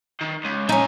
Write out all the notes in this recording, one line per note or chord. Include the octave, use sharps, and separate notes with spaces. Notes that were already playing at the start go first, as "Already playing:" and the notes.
D#3
C#2
A2 C#4 D#4 G#5